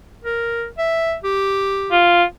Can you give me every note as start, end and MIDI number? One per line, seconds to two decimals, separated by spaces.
0.24 0.67 70
0.78 1.15 76
1.24 2.01 67
1.92 2.24 65